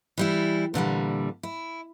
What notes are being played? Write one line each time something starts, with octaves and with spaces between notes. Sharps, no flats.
E3 G3 E4
A#2 D3 E3 G3
E4